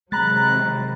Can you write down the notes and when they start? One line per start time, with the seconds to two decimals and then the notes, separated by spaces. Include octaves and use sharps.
0.12 C3 D#3 F#3 G#3 A#5 B5 F#6 A6